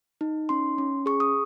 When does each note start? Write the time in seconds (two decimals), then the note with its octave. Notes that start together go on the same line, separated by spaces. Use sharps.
0.21 D#4
0.49 C#4 C6
0.78 C#4
1.06 G#4 C#6
1.20 D#6